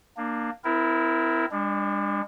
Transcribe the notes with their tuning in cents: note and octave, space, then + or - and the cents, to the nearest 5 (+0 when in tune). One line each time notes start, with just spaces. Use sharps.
A#3 +0 D4 +25
C4 -40 E4 +0 A#4 +0
G#3 -45 D4 +0